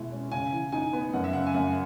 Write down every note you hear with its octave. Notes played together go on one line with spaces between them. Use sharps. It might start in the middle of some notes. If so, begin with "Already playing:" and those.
Already playing: B2 G#3 E4
C#4
C#3 G#5
E3
D#4 G#5
B3
F#2 F#5
E5
C#3 F#5
G#5
F#2 F#5